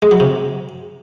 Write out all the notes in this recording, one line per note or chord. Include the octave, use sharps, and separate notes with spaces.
G#3
F#3
C3